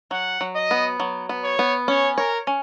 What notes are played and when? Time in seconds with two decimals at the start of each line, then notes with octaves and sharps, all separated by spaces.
0.11 F#3 F#5
0.41 F#3
0.55 D#5
0.71 B3
1.00 F#3
1.29 B3
1.44 C#5
1.59 B3
1.88 C#4 C#5
2.18 A#4 C#5
2.47 C#4